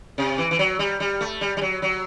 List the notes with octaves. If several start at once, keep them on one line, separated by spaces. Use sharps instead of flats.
C3
E3
E3
F#3
G3
G3
A3
G3
G3
F#3
F#3